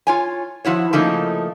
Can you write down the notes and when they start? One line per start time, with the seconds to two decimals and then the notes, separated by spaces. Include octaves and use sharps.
0.07 F4 C#5 G#5
0.65 F3 E4 F#4 C#5
0.93 C#3 F3 A3 A#3 D#4 E4